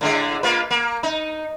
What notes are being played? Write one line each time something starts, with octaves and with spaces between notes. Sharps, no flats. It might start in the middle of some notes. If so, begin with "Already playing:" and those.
A2 D3 G#3
A#3 F4 B4
A#3
D#4